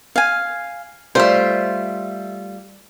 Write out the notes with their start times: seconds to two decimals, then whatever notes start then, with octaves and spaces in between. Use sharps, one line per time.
0.16 F5 G#5
1.15 G3 A3 F4 C5 E5